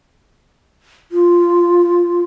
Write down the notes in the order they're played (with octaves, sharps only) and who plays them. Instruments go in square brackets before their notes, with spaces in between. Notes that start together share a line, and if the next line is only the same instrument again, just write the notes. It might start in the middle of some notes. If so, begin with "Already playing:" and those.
[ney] F4